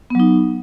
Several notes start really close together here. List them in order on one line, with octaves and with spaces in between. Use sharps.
B3 F#3 D#4